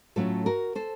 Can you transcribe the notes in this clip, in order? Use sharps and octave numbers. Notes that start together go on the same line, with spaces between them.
A2 F#3 A3 C#4 F4 A4
F#4 A#4
A4 C5